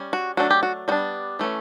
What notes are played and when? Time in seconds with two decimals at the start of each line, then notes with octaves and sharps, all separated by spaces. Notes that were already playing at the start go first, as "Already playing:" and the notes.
Already playing: G3 C#4
0.13 F#4
0.37 F#3 A3 D4 F#4
0.50 G4
0.63 F#4
0.88 G3 B3 D4 F#4
1.39 E3 A3 C#4